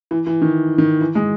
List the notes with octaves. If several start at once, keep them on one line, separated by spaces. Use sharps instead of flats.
E3
E3
D#3
D#3
E3
G#3